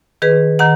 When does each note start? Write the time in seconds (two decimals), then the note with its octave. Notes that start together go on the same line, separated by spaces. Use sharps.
0.22 D#3 G#4 B4
0.59 D#3 F#5 A#5